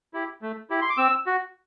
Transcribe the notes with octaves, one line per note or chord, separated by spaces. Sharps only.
E4 G4
A3
E4 G4
C6
D6
C4 E6
F#4